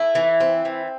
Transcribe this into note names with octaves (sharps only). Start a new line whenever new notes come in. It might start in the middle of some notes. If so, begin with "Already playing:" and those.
Already playing: A3 E4
E3
C4
E3